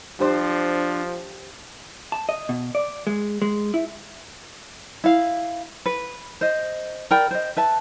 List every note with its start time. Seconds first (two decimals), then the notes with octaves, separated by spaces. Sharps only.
0.20 F3 D4 G4 C5
2.12 A5
2.29 D#5
2.49 B2
2.75 D5
3.07 G#3
3.42 G#3
3.74 E4
5.04 E4 F5
5.86 B4
6.41 C5 D#5
7.11 A#4 D5 G5 B5
7.31 C5 D#5
7.57 B4 E5 A5